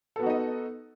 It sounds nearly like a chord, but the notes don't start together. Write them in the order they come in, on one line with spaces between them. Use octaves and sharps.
A4 B3 F#4 D#4 D#5